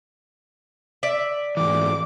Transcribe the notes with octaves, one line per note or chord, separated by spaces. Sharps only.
D5 E5
G#2 E3 D6